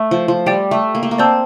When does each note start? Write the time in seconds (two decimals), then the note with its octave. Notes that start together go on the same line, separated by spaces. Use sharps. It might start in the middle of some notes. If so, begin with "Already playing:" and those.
Already playing: A3 E5
0.11 F3
0.28 F3
0.46 G3 G4 D5 G5
0.71 A3
0.95 A#3
1.03 A3
1.11 A#3
1.19 C4 D5 A5 E6 G6